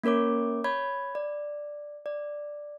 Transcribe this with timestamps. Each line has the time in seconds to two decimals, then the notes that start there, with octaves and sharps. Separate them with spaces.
0.04 A#3 C#4 A#4 C#5 D6
0.64 C#5 B5 G#6
1.15 D5
2.06 D5